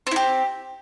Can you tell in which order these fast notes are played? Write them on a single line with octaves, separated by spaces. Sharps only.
C4 E4 G4